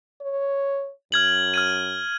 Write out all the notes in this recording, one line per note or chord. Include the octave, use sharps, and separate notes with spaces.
C#5
F#2 F6 G#6 F#7
F6 G#6 D#7